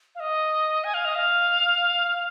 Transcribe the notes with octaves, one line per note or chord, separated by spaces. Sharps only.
F5
D#5
G#5
F5
D#5
F5
F5